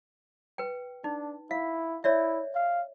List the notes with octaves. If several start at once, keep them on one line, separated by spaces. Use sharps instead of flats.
B4 G5
D4 D#4
E4 F5
E4 C#5 D5 E5
F5